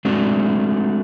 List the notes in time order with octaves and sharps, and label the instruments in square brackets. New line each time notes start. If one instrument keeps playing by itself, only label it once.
[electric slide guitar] G#3 A3 C4 D4 F#4